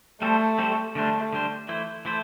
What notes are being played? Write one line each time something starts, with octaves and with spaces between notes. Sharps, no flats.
G3 A3 C4 A4 C5
G3 C4 A4 C5
D3 G3 A3 D4 C5
D3 G3 D4 C5
E3 A3 E4 C5
E3 A3 E4 C5